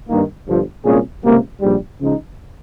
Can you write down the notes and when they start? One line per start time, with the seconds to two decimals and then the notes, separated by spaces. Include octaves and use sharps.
0.08 G2 D#3 A#3
0.46 G1 G2 F3
0.84 C2 A#2 G#3 C#4 G#4
1.23 C#2 C3 G3 A#3
1.61 A#1 G#2 G3
2.00 C#3 F3 G#3 D#4